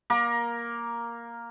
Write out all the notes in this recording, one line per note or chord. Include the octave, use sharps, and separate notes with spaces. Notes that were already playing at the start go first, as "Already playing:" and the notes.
A#3 A#4